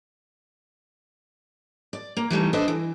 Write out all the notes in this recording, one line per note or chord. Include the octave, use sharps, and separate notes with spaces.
D5
A#3
E3 G3 A3 D#4
D4 A4 B4 C5 D#5 E5
E3